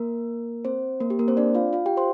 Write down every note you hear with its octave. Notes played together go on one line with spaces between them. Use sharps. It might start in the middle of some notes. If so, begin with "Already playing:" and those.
Already playing: A#3 A#4
C4 C5
A#3 A#4
G4
A#3 A#4
C4 C5
D4 D5
F4 F5
F4 F5
G4 G5
C5 C6